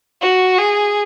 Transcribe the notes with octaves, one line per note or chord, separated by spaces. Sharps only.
F#4
G#4